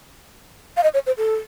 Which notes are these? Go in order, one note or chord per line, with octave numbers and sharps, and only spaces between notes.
F5
D#5
C#5
C5
A4